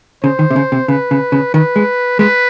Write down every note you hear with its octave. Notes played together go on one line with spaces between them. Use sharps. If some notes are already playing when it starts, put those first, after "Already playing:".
C#3 C5
D#3
C3
C#3
C3
C#3 B4
C#3
C#3
D#3 B4
G#3
G#3 B4